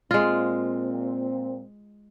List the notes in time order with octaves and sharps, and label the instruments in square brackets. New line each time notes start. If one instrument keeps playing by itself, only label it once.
[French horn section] A#2 C4 [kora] G#3 F4